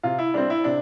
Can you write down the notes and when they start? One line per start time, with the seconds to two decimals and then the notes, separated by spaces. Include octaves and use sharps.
0.03 C3 F4
0.19 E4
0.34 G3 C4 D4
0.50 E4
0.64 C3 D4